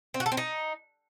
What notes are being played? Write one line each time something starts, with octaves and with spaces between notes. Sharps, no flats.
C4
F#4
A4
C4
D#4